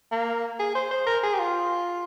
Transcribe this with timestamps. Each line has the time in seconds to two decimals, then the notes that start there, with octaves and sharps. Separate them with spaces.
0.12 A#3
0.59 G#4
0.75 C5
0.91 C5
1.07 A#4
1.23 G#4
1.34 G4
1.39 F4